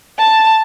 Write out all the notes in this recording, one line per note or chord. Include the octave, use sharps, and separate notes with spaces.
A5